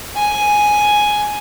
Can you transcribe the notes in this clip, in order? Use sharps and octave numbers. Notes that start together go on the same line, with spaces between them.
G#5